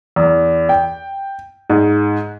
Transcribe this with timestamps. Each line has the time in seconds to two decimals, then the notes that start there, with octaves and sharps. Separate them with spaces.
0.16 E2
0.69 G5
1.70 G#2